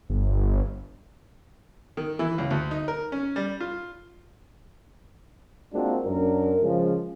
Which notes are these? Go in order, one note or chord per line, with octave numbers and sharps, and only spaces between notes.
G1
D#3
E3
C#2
D2
D#4
A#4
C#4
G3
F4
G#3 A#3 C4 D4 F4 F#4
F#2 D4 A#4
C#3 F3 G#3